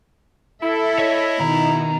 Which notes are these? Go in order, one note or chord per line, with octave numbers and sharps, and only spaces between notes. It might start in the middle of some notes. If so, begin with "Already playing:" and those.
E4 A4 E5
C#5 D#5
B2 D#3 D#4 A#5